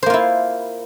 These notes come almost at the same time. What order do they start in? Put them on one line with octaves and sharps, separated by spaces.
C5 A#3 F4 E4